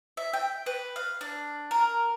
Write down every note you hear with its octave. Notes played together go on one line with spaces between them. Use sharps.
E5
G5
B4
F5
D4
A#4